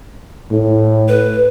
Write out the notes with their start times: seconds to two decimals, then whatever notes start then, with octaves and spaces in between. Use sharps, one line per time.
0.51 A2
1.08 B4